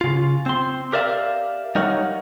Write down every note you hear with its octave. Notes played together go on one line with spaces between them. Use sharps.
C#3 F4
C4 C6
G4 A#4 D5 E5 F5
G3 D#4 A#4 C#5 F5 F#5